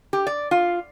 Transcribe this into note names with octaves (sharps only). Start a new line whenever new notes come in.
G4
D5
F4